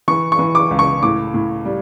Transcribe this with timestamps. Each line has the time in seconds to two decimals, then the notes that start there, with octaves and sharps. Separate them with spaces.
0.08 E3 C#6
0.32 C#6
0.39 E3
0.55 D6
0.71 C#2
0.79 C#6
1.03 A2 D6
1.34 A2
1.65 G3